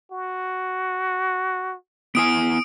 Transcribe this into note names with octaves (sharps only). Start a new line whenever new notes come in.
F#4
B3 E4 G#5 D#6 D7